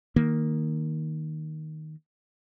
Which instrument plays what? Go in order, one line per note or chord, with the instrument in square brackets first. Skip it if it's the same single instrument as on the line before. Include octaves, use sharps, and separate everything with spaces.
[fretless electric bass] D#3 A#3